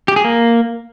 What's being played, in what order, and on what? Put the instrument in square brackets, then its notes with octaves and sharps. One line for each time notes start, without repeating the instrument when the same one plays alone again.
[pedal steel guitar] G4
G#4
A#3